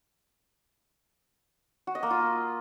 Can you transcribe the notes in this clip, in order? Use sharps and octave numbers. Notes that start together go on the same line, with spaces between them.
F#4
D#5
A#3
F4